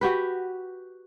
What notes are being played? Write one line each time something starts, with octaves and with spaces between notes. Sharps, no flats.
F#4 G4 B4